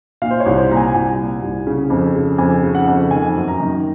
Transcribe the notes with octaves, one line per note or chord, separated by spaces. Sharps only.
A#2 F5
C5
C#5
C2
C5
A#2 A#5
G#5
C2 G#5
A#2
C2
C#3
F2
C#3
F2 G#5
C#3
F#5
F2
D#3 G#5
F#2
A#5
D#3